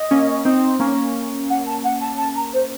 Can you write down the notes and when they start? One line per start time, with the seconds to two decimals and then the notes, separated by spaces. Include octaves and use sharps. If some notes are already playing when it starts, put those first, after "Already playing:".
Already playing: D#5
0.11 A#3 C#4
0.45 C4 D#4
0.80 A#3 C#4
1.49 F#5
1.66 A5
1.83 F#5
2.00 A5
2.18 A5
2.35 A#5
2.53 C5